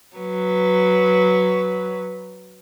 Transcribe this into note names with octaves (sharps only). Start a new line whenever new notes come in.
F#3 B4